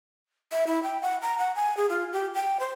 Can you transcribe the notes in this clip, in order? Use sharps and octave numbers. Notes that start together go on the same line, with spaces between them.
E5
E4
G5
F#5
A#5
F#5
G#5
G#4
F4
G4
G5
C5